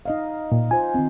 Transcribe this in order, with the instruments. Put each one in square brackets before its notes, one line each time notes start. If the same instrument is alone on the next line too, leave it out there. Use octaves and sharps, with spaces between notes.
[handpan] D#4 D#5 F5
[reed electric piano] A#2
[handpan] F4 C5 [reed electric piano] G#5
[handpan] D#3 C4